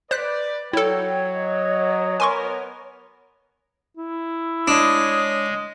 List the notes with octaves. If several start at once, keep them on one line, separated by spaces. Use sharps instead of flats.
B4 C5 D5 F#6 B6
F#3 E4 A4 C#5 G5
D#5
B3 A#4 G#5 C6 C#6
E4
G#3 D4 C#5 D#6